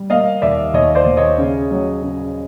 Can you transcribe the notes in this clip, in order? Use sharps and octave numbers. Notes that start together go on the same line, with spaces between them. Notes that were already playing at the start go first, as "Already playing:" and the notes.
Already playing: G3
A#3 D#5 F5
D#2 D5 E5
D#2 C#5 D#5
C5 D5
D#2
C#5 D#5
C#3
F#3
C#3